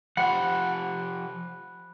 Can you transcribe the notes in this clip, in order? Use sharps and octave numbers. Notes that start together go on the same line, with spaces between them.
F3 G4 C5 F#5 B5 F#6